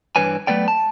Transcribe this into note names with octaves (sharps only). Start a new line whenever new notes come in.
G2 E3 D4 B4 C#5 G#5
F#3 A3 B3 D5 G5
A5